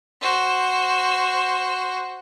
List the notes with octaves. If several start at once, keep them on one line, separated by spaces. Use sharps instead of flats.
F#4 C5